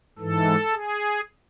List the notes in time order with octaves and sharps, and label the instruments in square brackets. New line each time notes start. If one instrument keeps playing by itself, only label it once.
[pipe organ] G#2 E3 A4
G#4